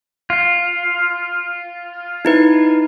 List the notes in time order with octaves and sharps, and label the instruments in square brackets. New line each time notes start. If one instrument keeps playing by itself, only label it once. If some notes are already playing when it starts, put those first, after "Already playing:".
[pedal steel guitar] F4
[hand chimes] D#4 E4 B4